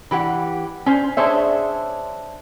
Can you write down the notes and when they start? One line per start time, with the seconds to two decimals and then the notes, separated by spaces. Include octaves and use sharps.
0.11 E3 G4 B4 F#5
0.86 C#4 C5
1.17 D4 G#4 C5 C#5 E5